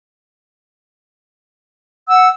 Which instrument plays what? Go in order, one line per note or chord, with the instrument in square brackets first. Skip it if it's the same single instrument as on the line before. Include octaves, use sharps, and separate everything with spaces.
[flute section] F#5 [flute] E6